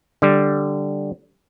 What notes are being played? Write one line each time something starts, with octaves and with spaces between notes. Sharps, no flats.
D3 G3